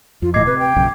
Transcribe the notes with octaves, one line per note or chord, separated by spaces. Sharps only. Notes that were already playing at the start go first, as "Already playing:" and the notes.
F2 F4
D1 A2 E3 D#5 D6 G#6 C7
C3 B4
G5
A#1 F#2 C#3